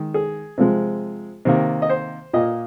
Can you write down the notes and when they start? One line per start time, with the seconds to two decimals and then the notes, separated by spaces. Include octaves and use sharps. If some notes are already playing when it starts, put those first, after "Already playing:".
Already playing: D#3 G#3
0.14 G#4
0.58 C3 F3 G#3
1.45 C3 D#3 A#3
1.82 D#5
1.89 C5
2.33 A#2 A#3 D#5